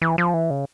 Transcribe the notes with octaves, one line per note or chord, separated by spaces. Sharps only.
E3
F3
E3
C#3